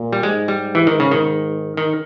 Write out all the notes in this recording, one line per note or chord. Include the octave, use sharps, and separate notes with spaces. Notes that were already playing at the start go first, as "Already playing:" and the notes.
Already playing: A#2
G3
G#2 G#3
G3
E3
D#3
C#3
D#3
D#3